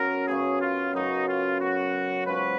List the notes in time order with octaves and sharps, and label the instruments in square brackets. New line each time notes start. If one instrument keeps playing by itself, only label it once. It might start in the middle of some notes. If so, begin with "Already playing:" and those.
Already playing: [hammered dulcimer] F#2 C#3 F#3 B3 [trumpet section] A#4
[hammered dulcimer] F#2 C#3 F#3 B3 [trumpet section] G#4
[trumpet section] F4
[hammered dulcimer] F#2 C#3 F#3 B3 [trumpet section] D#4
[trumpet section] F4
[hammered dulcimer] F#2 C#3 F#3 B3 [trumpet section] F#4
[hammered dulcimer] G#2 F#3 C#4 F4 [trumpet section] B4